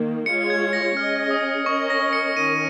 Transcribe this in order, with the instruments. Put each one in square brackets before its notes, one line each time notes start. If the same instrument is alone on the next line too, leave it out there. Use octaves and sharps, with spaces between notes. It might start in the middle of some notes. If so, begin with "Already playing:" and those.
Already playing: [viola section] D#3 A#3
[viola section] G#3 F4 G#4 C#5 [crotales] C#7
[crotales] G#6
A#6
[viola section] C#4 G#4 D#5 [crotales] F6
[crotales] D#6
[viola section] C#4 A#4 D#5 [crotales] C#6
[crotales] A#6
C#7
[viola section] D#3 C#4 A#4 [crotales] D#7